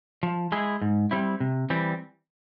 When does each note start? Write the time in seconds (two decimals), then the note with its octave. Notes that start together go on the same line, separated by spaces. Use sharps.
0.23 F3
0.52 G#3 E4 G#4
0.82 G#2
1.11 G3 C4 E4
1.40 C3
1.70 E3 G3 C4